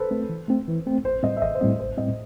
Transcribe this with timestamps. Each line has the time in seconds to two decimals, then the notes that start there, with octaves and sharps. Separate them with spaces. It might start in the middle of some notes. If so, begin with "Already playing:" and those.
Already playing: A4 B4 C5
0.11 A3 C4
0.30 E3
0.48 A3 C4
0.68 E3
0.86 A3 C4
1.04 A1 C5
1.23 A2 G3 C4 D#5
1.37 E5
1.41 A1 D#5
1.55 C5
1.61 A2 G3 C4 D#5
1.79 A1 C5
1.97 A2 G3 C4 D#5